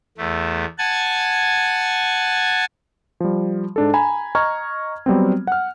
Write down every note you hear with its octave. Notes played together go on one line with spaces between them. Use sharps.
E2 A3
F#5 G#5 A5 G#6
F3 G3
G#2 D4 A4
G#5 A#5 B5
D#5 A#5 C#6 F6 G#6
F#3 G3 B3 C4
F#5 F6